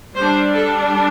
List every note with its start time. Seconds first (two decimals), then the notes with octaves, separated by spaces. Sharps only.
0.16 G3 D4 C5
0.54 A4